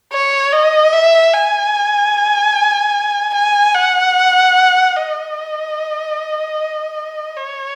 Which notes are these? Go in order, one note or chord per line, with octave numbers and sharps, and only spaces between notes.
C#5
D#5
E5
G#5
G#5
F#5
D#5
C#5